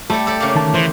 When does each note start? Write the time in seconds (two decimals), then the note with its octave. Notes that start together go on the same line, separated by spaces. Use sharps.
0.10 G3 A3 A4
0.26 G4 A4 D5
0.40 C#3 A#3
0.55 D#3 A5
0.74 E3 C5